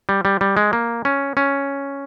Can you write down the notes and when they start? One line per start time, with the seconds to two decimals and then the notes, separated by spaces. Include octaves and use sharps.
0.09 G3
0.25 G3
0.41 G3
0.57 G#3
0.73 A#3
1.05 C#4
1.37 C#4